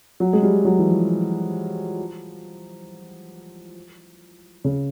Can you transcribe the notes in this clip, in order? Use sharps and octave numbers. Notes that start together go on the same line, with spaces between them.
F#3
G#3
G3
F#3
E3
F3
C#3